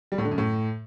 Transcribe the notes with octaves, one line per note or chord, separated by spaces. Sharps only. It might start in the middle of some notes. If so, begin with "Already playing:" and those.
G3
A2
D3
F#2
A2